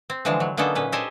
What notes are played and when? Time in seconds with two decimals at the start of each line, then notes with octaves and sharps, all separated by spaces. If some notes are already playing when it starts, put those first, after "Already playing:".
0.10 C4
0.25 D3 E3 F3 G#3 A5
0.40 F#3
0.57 D3 A#3 B3 C#4 D#4 A4
0.75 A#2 C#4 B4
0.92 G4 A4 C5 D#5 G#5